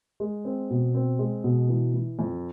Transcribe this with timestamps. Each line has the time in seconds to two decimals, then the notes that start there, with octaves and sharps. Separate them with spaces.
0.20 G#3
0.45 C4
0.70 B2
0.94 C4
1.19 G#3
1.44 B2
1.69 E3
1.94 E3
2.19 F2